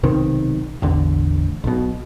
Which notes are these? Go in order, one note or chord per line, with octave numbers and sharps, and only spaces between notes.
B1 C3 D#3
A1 E2 D3
B1 B2